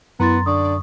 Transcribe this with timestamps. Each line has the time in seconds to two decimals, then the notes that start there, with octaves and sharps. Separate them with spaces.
0.20 F#2 B3 E4 A#5 C6 A6
0.46 D3 D5 C#6 D#6